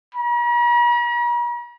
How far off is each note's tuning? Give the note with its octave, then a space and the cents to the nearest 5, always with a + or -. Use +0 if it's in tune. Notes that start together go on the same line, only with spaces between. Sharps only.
A#5 +45